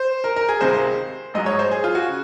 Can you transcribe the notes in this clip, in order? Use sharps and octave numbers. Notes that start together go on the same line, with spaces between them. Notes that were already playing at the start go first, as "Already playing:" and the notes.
Already playing: C5
A#4
A#4
G#4
C#2 C3 D#3 G#3 C5
A#1 G#2 F#3 D#5
C#5
C5
G#4
F4
F#4
C#3